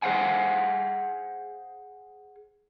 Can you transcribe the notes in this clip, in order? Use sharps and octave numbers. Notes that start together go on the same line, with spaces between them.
G#4 C5 F5 F#5 G#5